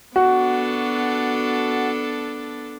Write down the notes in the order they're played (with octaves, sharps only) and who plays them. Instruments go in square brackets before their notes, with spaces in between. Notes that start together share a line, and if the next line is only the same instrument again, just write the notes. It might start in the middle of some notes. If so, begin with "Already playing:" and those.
[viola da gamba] B3 D4 A4 [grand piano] F#4